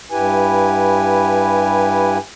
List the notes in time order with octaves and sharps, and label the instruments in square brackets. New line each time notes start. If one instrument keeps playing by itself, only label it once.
[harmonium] G2 E4 G4 B4 G#5